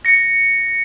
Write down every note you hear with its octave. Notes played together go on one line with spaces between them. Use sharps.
A#6 C#7